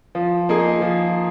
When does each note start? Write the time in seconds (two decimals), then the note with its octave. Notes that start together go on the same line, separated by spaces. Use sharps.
0.15 F3
0.49 A#3 D#4 G#4
0.82 F3